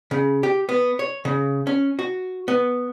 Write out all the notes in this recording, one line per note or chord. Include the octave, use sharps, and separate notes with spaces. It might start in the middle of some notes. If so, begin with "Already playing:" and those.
C#3
G4
B3
C#5
C#3
C#4
F#4
B3